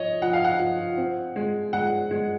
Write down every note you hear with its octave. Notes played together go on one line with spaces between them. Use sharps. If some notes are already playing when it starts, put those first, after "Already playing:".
Already playing: F3 C#5 D#5
F3 F#5
F5
F#5
F3
C4
G#3
G#3 F#5
G#3